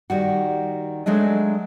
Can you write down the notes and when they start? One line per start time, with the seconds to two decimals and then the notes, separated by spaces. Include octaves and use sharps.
0.10 D#3 G3 F#4
1.06 F#3 G#3 A3 D4 D#5